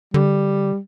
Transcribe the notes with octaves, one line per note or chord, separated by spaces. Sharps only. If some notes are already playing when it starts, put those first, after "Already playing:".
D3 G3